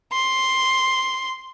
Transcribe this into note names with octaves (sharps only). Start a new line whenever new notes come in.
C6